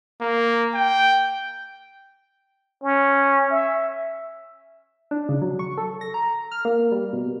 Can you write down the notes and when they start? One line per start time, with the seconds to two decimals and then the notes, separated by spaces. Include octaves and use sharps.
0.21 A#3
0.74 G5
2.83 C#4
3.52 E5
5.11 D4
5.29 C#3
5.42 F#3
5.59 C#6
5.77 A4
6.01 A#6
6.14 A#5
6.51 F6
6.65 A#3
6.92 G3
7.13 B2